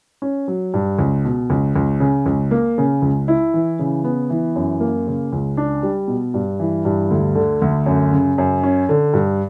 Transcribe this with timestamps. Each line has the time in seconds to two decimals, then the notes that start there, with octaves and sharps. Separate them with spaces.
0.22 C#4
0.48 F#3
0.74 G2
0.99 C#2
1.25 B2
1.50 C#2
1.76 C#2
2.00 C#3
2.26 C#2
2.51 A#3
2.78 C#3
3.02 C#2
3.28 E4
3.54 E3
3.79 C#3
4.04 B3
4.30 E3
4.56 F#2
4.80 A#3
5.07 C#3
5.32 C#2
5.57 D4
5.83 G3
6.08 B2
6.34 G2
6.60 E3
6.85 G2
7.11 D2
7.35 D3
7.62 D2
7.86 F#2
8.13 C#3
8.38 F#2
8.63 C#4
8.89 D3
9.14 G2